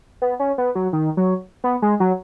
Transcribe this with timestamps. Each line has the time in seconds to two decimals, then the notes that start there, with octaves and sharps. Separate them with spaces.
0.22 B3
0.40 C#4
0.58 B3
0.75 F#3
0.93 D#3
1.17 F#3
1.64 B3
1.82 G#3
2.00 F#3